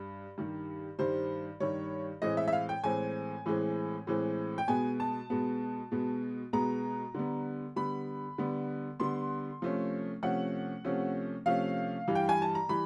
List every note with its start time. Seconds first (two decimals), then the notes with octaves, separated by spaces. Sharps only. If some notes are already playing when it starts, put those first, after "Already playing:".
Already playing: G2
0.38 G2 D#3 G3
0.99 G2 D#3 G3 C5
1.60 G2 D#3 G3 C#5
2.22 A2 E3 G#3 C4 D#5
2.37 E5
2.48 E5
2.52 F5
2.69 G5
2.84 A2 E3 G#3 C4 G#5
3.46 A2 E3 G#3 C4
4.07 A2 E3 G#3 C4
4.58 G5
4.68 B2 G#3 B3 G#5
5.00 A5
5.30 B2 G#3 B3
5.92 B2 G#3 B3
6.53 B2 G#3 B3 A#5
7.14 D3 G3 B3
7.76 D3 G3 B3 B5
8.38 D3 G3 B3
9.00 D3 G3 B3 C6
9.62 C3 F3 A3 C#4
10.23 C3 F3 A3 C#4 F#5
10.84 C3 F3 A3 C#4
11.46 C3 F3 A3 C#4 F5
12.08 G2 E3 G3
12.15 G5
12.29 G#5
12.42 A5
12.55 A#5
12.69 E3 G3 B5